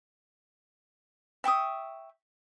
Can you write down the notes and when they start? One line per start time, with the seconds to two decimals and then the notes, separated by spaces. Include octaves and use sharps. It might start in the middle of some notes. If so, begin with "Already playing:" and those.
1.44 E5 G5 C#6 D#6